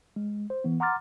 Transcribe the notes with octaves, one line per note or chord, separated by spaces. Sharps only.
G#3
C5
E3 B3
F#5 A#5 C6 D6 F6 A6